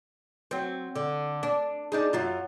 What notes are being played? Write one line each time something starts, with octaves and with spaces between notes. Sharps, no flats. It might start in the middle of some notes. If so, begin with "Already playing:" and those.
F#3 C4
D3
D4
D4 D#4 G#4
F#2 F#3 F4